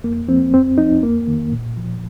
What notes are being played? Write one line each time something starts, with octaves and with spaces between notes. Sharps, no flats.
F2 A#3
F3 C4
F2 C4
F3 D#4
F2 A#3
D#3
A#2
F3